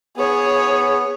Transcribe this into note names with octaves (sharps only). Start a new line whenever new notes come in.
B3 G#4 C#5